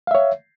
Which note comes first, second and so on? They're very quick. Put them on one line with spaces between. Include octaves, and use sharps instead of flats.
F5 E5 C#5